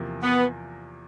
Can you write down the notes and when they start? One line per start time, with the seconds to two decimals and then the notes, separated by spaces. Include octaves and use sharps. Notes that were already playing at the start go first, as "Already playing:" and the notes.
Already playing: E2 C3 F3 A#3
0.23 B3